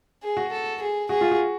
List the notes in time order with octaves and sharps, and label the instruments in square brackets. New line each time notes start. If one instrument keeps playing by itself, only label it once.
[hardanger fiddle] G#4
[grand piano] F#4
[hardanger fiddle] A4
G#4
[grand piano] F#4 [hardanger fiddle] G#4
[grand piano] F4
F#4